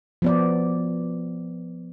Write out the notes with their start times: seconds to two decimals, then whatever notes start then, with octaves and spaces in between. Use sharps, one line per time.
0.22 F3 B3 D5